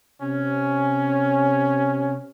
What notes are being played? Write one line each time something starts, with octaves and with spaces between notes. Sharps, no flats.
C3 C#4